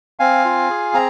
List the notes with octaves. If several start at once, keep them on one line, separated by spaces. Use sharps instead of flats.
C4 F5 G#5
F4
G#4
C4 A#5